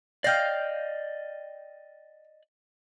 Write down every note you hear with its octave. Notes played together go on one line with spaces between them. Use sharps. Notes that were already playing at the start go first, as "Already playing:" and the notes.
D5 D#5 F5 G5 F6 G6 A#6